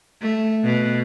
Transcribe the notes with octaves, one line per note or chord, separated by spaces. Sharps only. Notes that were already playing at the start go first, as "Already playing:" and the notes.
A3
B2